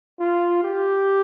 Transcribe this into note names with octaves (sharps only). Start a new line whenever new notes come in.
F4
G4